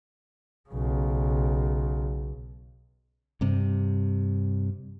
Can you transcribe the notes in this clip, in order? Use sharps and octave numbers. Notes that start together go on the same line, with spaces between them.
B1 C#3
G2 C3